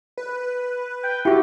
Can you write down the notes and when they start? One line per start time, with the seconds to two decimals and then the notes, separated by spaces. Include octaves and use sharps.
0.18 B4
1.03 G5
1.25 E4 F#4 G4